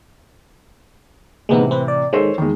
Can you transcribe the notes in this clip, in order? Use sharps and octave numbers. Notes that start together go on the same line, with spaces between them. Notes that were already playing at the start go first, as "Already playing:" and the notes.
A2 C3 E3 G#3 B3 D#4
C4 B4
D5
D#3 G#3 A4 C5 C#5
E2 D#3 G#3